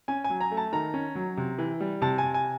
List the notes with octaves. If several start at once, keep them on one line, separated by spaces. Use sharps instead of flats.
C#4 G#5
G#5
F#3
A#5
A3
A5
D#3 A#5
C#4
F#3
C3
E3
G3
C3 A5
C3 G#5
G#5